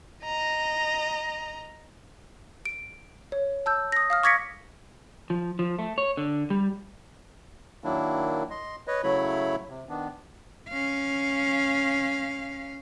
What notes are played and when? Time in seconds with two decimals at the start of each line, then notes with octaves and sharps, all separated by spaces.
0.24 D#5 A#5
2.65 D7
3.32 C#5
3.66 A5 E6 G6
3.92 D#6 A#6
4.10 F5 D#6 F6
4.23 C#6 D6 G#6 A#6 B6 C#7
5.30 F3
5.59 F3
5.79 A3
5.98 C#5
6.17 D3
6.50 G3
7.84 D#3 F#3 A#3 D4 E4
8.50 D#5 C6
8.87 B4 C#5 D#5
9.03 C#3 F#3 A3 E4 C#5 B5
9.69 C3
9.89 D#3 B3 D4
10.69 C#4 F5